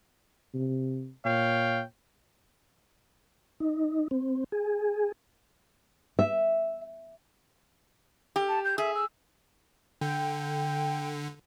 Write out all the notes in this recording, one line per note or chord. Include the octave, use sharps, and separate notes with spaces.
C3
A#2 C#5 F5 G5
D#4
C4
G#4
E5
G4
A5
G6
G#4 E5
E6
D3 G5